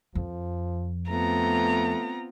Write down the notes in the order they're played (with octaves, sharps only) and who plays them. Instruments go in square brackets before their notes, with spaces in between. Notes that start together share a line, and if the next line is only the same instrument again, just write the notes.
[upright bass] F2 [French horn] F3
[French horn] A3 [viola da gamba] B3 C4 F4 [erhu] A#5